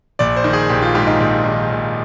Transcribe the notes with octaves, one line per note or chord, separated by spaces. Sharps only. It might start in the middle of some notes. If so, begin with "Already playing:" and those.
A#1 D5
C5
D#3
G#4
A#1 G4
F4
G#2 G4
D#4
A#1
D#3
A#1